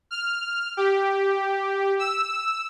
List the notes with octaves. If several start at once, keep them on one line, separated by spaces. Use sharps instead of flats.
F6
G4
E6